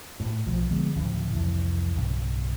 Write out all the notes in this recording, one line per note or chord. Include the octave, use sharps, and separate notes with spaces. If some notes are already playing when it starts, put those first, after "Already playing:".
A2
B1 F3
D3 F3 G#3 B3
D2 A2 C#3 F3
C2 F2 E3
B1 G2 C#3